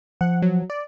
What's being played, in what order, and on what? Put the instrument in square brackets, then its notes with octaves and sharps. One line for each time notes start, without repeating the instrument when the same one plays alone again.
[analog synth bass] F3 [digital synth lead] F#5
[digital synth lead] F#3
D5